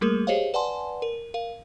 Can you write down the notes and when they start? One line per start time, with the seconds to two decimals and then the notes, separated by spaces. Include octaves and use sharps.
0.01 G3 A3 A#3 G#4 A#4
0.27 G4 G#4 C5 C#5 D#5 F5
0.54 B4 D5 F#5 G#5 A5 C6
1.02 A#4
1.34 A#4 F5